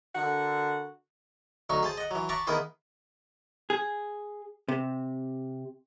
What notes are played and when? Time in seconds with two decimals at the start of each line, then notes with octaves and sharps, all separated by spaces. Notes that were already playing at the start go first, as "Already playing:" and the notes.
0.15 D3 F#4 A#4
1.70 D2 F#3 D#4 C#6
1.83 G#4 C5 A5
1.97 D#5 F#5
2.11 E3 F#3
2.29 E5 F#5 A5 A#5 C#6 D6
2.47 D#3 A#3 B3 E4 G#4 C5
3.70 G#4
4.68 C3